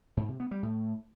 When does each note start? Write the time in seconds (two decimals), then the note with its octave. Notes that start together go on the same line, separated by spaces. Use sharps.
0.17 G#2
0.28 C3
0.40 B3
0.51 G3
0.63 A2